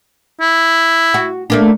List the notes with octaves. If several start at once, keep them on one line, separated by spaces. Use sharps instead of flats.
E4
F#4
A3 A#3 D4